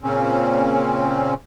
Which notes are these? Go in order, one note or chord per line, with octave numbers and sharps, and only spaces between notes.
A#2 C#3 C4 C#4